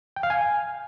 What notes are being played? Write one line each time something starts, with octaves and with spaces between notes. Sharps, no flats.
G5
F5
G#5